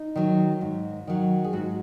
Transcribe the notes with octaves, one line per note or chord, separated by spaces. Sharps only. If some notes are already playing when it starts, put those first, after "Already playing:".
Already playing: D#4
D#3 F#3
G#2
D#3 F#3
G#4
G#2 F#4